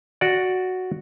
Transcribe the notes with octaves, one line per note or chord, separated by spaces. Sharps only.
F#4 D5